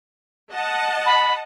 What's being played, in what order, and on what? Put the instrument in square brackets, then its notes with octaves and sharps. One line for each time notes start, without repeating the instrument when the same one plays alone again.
[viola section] D#5 F#5 A5
[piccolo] B5